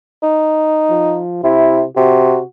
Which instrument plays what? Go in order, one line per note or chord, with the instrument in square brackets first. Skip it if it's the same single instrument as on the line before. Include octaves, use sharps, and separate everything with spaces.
[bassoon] D#4
[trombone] F3
[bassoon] C3 [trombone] E4
[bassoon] C3 [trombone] F#4